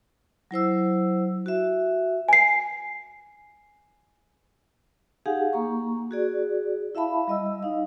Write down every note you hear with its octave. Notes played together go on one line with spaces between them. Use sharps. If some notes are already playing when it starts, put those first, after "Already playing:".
F#3 E4 C5 E6
F#4 E5
G#5 C7
D#4 G4 G#4 F5 F#5 G#5
A#3 A#5 C#6
F#4 G#4 D5
E4 E5 F5 A5 B5
G3 D#5 E6
D#4 F5